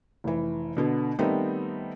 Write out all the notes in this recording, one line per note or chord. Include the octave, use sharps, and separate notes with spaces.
F1 E3
B2 D3 B3
D#3 G3 A3 B3 C4 D#4